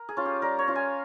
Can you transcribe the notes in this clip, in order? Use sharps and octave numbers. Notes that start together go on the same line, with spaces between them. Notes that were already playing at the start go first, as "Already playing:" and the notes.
Already playing: A#4
G#4
C#4 F4
G4
G3 A#4
C#5
C#4 F4
G#5